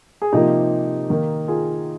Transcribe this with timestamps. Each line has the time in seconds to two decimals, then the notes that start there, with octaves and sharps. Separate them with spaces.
0.22 G#4
0.33 C3 F3 A#3 D#4 G4
1.10 D#3 A#3
1.48 F4 G#4